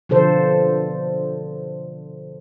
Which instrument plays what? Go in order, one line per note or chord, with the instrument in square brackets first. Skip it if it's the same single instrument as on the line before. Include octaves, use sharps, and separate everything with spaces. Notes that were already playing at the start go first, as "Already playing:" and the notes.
[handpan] B2 D3 F3 A4 C5